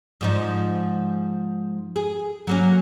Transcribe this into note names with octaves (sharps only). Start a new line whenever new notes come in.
G#2 F3 D#4
G#4
F#3 A#3 C#4